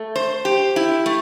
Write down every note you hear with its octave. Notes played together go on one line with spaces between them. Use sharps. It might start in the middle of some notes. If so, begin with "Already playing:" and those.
Already playing: A3
C5
G4
E4
A3